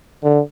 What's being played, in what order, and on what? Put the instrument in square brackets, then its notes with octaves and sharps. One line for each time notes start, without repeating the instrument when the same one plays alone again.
[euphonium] D3